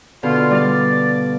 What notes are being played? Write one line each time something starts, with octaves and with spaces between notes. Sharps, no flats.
B2 D3 F4 F5
G3 D5 F5